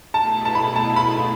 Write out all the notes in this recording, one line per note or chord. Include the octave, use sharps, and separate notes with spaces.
B2 A3 E4 G#4 A5
A5
B5
A5
B5